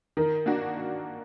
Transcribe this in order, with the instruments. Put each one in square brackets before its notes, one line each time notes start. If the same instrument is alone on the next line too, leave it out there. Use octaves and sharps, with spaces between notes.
[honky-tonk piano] D#3 [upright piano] A#4
[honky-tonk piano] A#3 D4 F#4